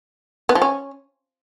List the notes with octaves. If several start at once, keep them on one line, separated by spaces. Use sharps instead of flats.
B3
F3
C#4